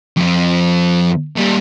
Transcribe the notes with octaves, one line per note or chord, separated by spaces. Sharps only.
F2 F3
A#2 G3